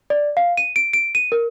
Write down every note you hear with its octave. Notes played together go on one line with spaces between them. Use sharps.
D5
F5
D#7
D7
D7
D#7
A#4